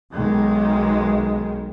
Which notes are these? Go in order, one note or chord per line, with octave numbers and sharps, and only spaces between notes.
B1 D#3 G#3